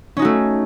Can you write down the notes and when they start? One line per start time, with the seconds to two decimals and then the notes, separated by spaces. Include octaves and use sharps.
0.17 C#4
0.19 D#4
0.22 F#4
0.25 A3